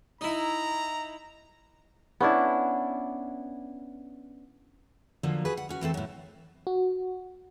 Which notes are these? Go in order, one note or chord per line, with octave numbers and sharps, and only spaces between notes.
D#4 E4 A#5
B3 C#4 D4 E4
D3 F3 F#3 A#3
F#4 G#4 B4
F#5
C#4 F#4
E3 A3 C4 A4
A2 F#3
F#4